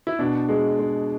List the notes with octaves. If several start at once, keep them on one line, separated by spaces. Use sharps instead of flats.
E4
B2 D4
G#3
G#3